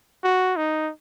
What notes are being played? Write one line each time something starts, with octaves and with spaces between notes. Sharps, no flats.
F#4
D#4